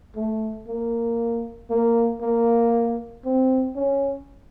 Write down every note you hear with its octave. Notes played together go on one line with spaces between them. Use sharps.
A3
A#3
A#3
A#3
C4
C#4